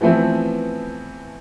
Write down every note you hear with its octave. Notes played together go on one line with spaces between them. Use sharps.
E3 F3 A3 B3 C4